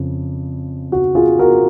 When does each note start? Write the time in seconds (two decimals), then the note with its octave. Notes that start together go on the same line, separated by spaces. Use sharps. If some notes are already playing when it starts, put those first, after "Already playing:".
Already playing: F2 C#3
0.92 F#4
1.15 F4 G#4
1.39 F#4 A#4